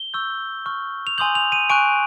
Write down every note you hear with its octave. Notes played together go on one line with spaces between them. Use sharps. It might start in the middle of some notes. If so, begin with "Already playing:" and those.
Already playing: G7
C#6 E6 G6
C#6 F6
F7
G#5 C6 D#6 G6 F#7
F7
D#7
G#5 C#6 F#6 D7